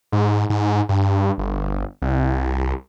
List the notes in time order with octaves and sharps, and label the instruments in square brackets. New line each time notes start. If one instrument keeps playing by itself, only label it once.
[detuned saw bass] G#2
G#2
G2
G1
C2